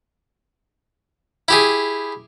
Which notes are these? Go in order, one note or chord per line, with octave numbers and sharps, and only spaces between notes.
E4 G4 G#4